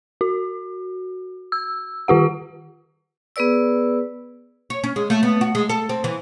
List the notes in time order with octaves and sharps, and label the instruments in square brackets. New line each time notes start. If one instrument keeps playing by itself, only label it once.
[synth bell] F#4
E6
D#3 F4 G4 F#5
[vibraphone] B3 G#4 B4 D5 E6
[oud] C#5
C#4
G#3
A3
B3
F#4
G#3
A4
C4
E3